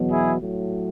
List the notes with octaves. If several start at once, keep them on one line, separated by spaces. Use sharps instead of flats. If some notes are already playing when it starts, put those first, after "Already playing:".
Already playing: E2 B2 F#3
E4 G#4
A2 F#3